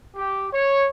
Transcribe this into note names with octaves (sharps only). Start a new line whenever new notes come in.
G4
C#5